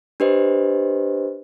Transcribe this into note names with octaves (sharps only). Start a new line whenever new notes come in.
D4 G4 B4 C5 D#5